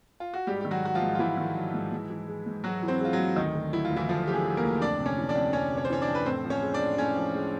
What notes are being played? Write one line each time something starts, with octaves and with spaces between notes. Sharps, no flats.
F4
F#4
G#2 G3 G4
D#3 G4
F#3 F#4
F#3 F#4
F3 F4
G#2
F4
G#2 E3 E4
D#3
F#3
G#2
G#2
E3
G#3
G#2
G#2 F#3 F#4
E3
C4 C5
G#3 F4
F#3 F#4
G#2
D2 D#3 D#4
D3
F#3 E4
F4
D2
E3 E4
D2 F3 F4
D3 G4
G#3 G#4
F#3
A#3 A#4
D2
F2 D4 D5
C3
C#4 C#5
E3
D4 D5
F2
F2 C#4 C#5
C3
C#5
C5
E3 C#4 C#5
D4 D5
F2
B4
A2 C4 C5
F3
C#4 C#5
G#3
D4 D5
A2
A2 C#4 C#5
F3
G#3